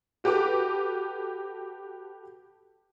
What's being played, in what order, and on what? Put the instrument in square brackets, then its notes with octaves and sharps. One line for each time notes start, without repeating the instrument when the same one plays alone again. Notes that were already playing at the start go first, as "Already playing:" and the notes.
[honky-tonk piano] F#4 G4 A4 B4 D6